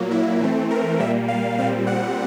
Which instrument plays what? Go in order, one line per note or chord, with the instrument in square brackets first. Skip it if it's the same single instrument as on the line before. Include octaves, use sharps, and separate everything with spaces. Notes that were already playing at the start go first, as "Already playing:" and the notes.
Already playing: [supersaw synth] A#2 F#3 A#3
E4
E3 A3 C4
A#4
A#2 G3 A#3 E5
F5
A#2 G3 C4 F5
F#5